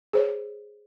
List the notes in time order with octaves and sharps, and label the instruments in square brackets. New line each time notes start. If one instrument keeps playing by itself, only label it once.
[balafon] G#4 C5 C#5